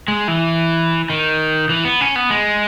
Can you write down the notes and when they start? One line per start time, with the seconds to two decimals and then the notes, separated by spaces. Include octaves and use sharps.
0.08 G#3
0.28 E3
1.10 D#3
1.69 E3
1.85 B3
2.01 C#4
2.16 B3
2.31 G#3